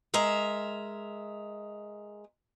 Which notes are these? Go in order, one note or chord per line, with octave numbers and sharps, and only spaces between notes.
G#3 A#4 E5